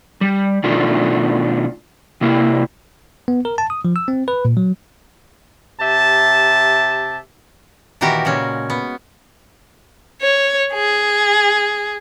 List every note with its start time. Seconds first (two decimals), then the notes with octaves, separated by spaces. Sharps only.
0.21 G3
0.64 B2 D#3 A3 D4 F4
2.21 C3 A#3 E4
3.28 B3
3.45 A#4
3.58 A5
3.70 D#6
3.85 F3
3.96 E6
4.08 C4
4.28 B4
4.45 A#2
4.57 F#3
5.81 C3 G4 E5 A5
8.01 A#2 D#3 E3 F#4 G4 A#4
8.25 A#2 C#3 G#3 C#4
8.70 B3
10.22 C#5
10.74 G#4